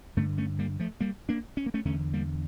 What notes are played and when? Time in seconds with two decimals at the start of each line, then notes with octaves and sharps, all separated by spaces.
0.17 G2 D3 A3 C#4
0.38 A3 C#4
0.59 G3 A#3
0.79 F3 A3
1.00 G3 A#3
1.29 A#3 D4
1.57 C#4
1.66 A#3
1.74 A3 C#4
1.85 E2 D3 A3 C#4
2.13 G3 A#3